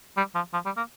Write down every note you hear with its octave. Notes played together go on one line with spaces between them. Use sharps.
G3
F3
F3
G3
A#3